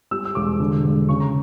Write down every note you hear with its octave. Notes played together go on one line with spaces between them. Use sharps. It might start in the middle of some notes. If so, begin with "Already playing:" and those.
G3 E6
E6
E1 D6
D3
E1
C#3 C#6
A#5